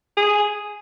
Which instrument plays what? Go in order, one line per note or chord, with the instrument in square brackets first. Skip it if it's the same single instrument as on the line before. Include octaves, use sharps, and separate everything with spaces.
[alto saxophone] G#4